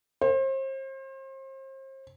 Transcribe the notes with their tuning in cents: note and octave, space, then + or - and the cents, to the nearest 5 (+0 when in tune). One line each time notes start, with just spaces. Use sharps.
C5 +35